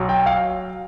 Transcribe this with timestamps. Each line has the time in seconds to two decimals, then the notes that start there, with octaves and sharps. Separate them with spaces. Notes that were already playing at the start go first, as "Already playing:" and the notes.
Already playing: B1 F#3
0.09 G5
0.26 F5